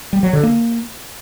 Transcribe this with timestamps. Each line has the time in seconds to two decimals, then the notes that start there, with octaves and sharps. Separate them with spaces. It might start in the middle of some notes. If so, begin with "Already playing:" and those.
0.13 G3
0.23 F#3
0.33 D3
0.43 A#3